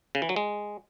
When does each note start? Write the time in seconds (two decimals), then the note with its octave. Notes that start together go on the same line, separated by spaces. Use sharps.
0.15 C#3
0.22 E3
0.29 F#3
0.36 G#3